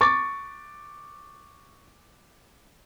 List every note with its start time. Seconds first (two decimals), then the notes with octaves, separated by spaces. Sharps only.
0.01 C#6 D6 A6